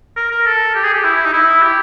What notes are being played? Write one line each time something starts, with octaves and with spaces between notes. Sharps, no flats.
A#4
A#4
A4
G4
G#4
G4
E4
D#4
E4
G4